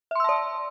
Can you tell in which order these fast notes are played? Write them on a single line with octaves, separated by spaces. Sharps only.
E5 C6 E6 A5 D5